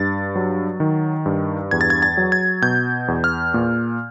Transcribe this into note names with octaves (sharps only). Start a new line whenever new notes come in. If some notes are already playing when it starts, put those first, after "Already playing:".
Already playing: G2 A6
F#3
D#3
G2
E2 G#6
A6
G#6
A6
F#3
G#6
B2 G6
E2
F6
A#2